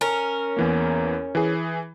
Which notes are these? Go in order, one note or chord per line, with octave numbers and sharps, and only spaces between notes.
C#4 A#4
E2 E3 A#3
E3 G#4